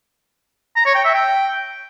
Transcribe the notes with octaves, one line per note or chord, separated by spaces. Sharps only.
A#5
C#5
G5
E5
G5